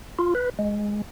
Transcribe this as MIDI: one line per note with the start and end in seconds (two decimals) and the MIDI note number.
0.19 0.34 65
0.35 0.50 71
0.59 1.02 56